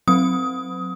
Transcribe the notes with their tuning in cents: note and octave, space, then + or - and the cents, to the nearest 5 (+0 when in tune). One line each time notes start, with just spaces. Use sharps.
F#3 -15 C4 +0 D#6 +20